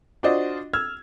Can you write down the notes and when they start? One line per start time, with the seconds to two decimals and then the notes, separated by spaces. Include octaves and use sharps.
0.23 D4 F4 F#4 C5 D5 D#5
0.73 E6 F6 G#6